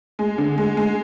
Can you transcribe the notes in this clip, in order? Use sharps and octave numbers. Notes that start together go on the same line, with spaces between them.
G#3
D3
G#3
G#3